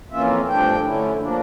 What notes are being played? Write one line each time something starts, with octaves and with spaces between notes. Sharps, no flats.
F2 E3 A#3 C#4 F4 E5
G2 F3 A3 D4 G5
D3 A3 C#4 E4
F3 A#3 D4